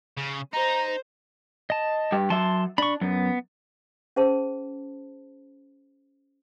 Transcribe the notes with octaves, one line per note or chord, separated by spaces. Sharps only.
C#3
D#4 C5 A#5
D#5 A5
G2 G4
F#3 E5 A5 C6
D4 B5 C#6
F#2 B3
C#4 G#4 C5 A5